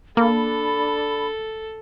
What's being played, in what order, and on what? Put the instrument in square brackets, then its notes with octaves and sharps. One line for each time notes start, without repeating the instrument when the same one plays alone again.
[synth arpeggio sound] A#3 [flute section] D4 B5 [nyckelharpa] A4